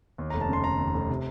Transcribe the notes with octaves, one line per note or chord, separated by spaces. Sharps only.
D#2
A#5
F1
A5
C#3 C6
F1 A#5
D#2
F1
C3